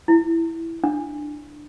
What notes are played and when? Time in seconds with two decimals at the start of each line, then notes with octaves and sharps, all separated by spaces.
0.08 E4
0.84 D4